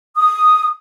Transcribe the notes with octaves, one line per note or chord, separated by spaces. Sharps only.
D#6